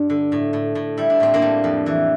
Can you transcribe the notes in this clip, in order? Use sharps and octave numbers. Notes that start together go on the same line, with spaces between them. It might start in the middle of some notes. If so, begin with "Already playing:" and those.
Already playing: G2 D4
D3
A2
A2
A2
G3 E4
D4
A2 C4
A#3 D4
G3
F2
E3